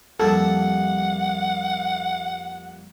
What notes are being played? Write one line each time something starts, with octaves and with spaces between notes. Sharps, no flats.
F2 G3 A#3 A4 F#5